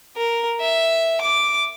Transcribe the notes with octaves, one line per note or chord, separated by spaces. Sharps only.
A#4
E5
D6